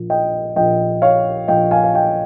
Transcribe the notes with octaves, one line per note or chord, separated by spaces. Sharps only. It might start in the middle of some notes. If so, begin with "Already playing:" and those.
Already playing: A#1 A#2
D#5 G5
A#1 A#2 D#5 G5
C#5 F5
A#1 A#2 D#5 G5
F5 G#5
F5
D#5 G5